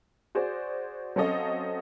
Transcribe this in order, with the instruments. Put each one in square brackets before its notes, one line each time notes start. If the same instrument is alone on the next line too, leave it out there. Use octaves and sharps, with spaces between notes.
[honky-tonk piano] F#4 G#4 C5 D5
F#3 C4 C#4 A4 D#5 F5